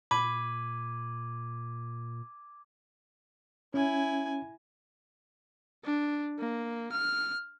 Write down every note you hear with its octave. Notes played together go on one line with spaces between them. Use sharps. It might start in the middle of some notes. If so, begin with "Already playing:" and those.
A#2 B5 D6 G#6 D#7
C#4 E4 G#5
D4
A#3
F6